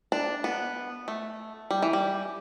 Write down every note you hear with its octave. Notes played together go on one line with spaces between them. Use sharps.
D4
B3
A3
G3
E3
G3